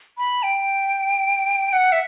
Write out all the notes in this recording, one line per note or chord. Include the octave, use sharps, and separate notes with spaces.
B5
G5
F#5
E5